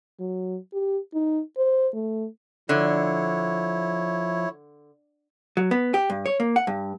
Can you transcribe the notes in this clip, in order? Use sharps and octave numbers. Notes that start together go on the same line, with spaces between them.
F#3
G4
D#4
C5
A3
D3 F3 E4 C#5
F#3
B3
G4
G2
C#5
A#3
F#5
G2